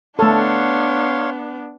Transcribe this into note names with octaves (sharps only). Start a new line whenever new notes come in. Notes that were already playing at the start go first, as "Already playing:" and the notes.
A3 B3 D4 A4 C#5 F5 C6